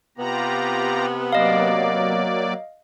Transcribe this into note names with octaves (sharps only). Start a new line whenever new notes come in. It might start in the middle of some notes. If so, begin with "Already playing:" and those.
C3 B3 F4 G4 A#5
F#3 A#3 D5 D#5 F5